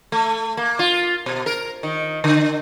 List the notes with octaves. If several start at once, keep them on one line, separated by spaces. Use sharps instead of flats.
A3
A#3
F4
B2
A#4
D#3
D3